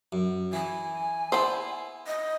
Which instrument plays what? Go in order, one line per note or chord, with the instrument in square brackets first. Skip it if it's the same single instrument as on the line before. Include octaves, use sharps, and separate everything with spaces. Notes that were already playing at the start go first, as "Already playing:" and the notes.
[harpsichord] F#2
[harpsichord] E3 [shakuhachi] G#5
[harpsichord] B3 E4 [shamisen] C5 G5 A5
[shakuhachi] D#5